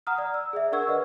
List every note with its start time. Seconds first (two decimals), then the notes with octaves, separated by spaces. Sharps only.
0.07 F#5 A#5 D#6 F6
0.18 D5
0.34 E6
0.53 G#4 D5 E5
0.72 D4 A#4 F#5 C#6 E6 G#6
0.88 B4 D5 D#5 F#5